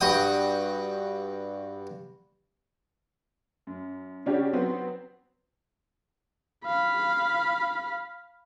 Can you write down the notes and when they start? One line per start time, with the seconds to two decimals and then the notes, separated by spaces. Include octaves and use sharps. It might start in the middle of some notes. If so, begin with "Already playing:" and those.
0.01 G2 F#4 G5 D#6
3.67 F#2
4.26 C#3 C#4 D4 F#4 G4
4.53 F#3 B3 C4
6.65 F5 B5